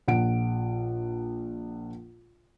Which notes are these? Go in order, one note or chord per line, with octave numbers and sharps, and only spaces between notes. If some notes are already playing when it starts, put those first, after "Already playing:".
A#1 F#5 D7